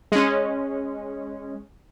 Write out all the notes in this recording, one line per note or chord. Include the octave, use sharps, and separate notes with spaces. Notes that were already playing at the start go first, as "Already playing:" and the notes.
G#3 C#4